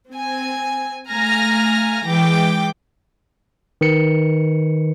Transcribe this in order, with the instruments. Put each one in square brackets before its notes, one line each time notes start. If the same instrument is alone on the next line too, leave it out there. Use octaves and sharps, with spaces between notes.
[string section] C4 G#5
A3 F5 G#5 A#5 F6 A#6
E3 G#3 G5 D6
[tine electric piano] D#3 B4 C#7